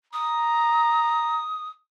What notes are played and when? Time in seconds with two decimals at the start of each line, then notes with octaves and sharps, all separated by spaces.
0.13 A#5 D#6